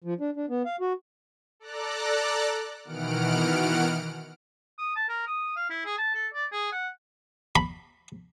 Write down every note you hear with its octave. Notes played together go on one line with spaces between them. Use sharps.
F3
D4
D4
B3
F5
F#4
A4 D5 A#5 F#6
B2 D#3 E3 F#5 F6 D7
D#6
A5
A#4
D#6
F5
E4
G#4
A5
A4
D5
G#4
F#5
B5